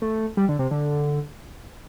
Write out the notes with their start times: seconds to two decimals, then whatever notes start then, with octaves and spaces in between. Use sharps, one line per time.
0.02 A3
0.37 G3
0.49 D3
0.59 C3
0.71 D3